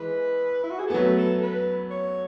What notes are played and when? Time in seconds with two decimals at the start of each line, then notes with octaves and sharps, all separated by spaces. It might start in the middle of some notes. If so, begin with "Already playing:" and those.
Already playing: E3 G#3 B4
0.63 E4
0.70 F#4
0.79 G#4
0.87 A4
0.90 B3
0.94 F#3 A3 B4
1.18 A4
1.42 B4
1.90 C#5